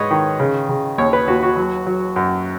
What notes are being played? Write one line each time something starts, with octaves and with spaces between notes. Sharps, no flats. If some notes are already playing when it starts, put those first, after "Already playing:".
Already playing: G#2 B4 C#5 D#5
D#3
C#3
C#3
D#2 C#5
B4
D#2 F#4
F#4
F#3
F#3
F#2